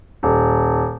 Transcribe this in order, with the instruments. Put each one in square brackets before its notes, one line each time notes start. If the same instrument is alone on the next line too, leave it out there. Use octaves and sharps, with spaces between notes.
[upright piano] D#1